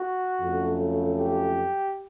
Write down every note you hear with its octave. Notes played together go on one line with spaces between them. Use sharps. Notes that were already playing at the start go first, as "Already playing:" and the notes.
Already playing: F#4
F2 C#3 F#3 A3
G4